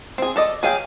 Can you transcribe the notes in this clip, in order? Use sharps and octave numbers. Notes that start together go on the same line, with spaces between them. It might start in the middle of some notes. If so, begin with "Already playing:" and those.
C4 G#4
A4 D5 D#5
F#3 G#4 F5 G5